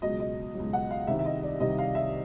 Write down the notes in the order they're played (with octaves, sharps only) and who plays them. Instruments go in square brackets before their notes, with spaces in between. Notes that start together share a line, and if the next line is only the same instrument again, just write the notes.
[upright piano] C#2 B2 F#3 D#5
D#5
C#2 B2 F#3
F#5
F5
C2 C3 D#3 G3 E5
E5
D#5
D5
C2 C3 D#3 G3 D#5
F5
E5